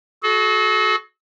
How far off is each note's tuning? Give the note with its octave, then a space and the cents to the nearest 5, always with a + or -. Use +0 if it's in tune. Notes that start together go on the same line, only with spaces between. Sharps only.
F#4 +0 A4 -40